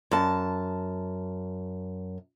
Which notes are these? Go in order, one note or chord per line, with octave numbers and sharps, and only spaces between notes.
F#2 A5